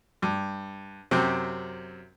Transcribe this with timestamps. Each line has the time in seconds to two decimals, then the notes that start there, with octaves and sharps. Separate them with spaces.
0.22 G2
1.11 F#2 C3 C4